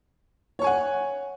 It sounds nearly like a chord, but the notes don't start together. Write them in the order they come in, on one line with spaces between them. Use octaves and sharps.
C#5 C#6 G#5 F#5